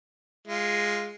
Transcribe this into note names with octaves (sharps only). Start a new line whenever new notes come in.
G#3 F4